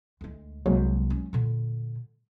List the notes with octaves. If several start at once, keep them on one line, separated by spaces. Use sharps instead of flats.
D2 G#3
C2 F#3 G#3 A#3
C#4
A#2 D3